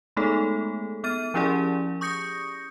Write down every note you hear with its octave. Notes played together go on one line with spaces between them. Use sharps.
G#3 A3 B3 D#4 G#4 A4
B3 F6 A6 D#7
F3 C#4 E4 G4 G#4 D5
C#6 D#6 G6 A#6 C#7